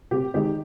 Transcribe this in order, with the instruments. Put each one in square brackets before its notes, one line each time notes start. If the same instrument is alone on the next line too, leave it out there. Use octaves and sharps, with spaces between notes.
[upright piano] C3 G4
D#3 G#3 G4